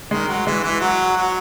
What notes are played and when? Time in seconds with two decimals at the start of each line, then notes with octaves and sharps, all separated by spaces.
0.11 D#3 G#3
0.28 F#3
0.46 E3 G#3
0.64 E3
0.81 F#3
1.16 F#3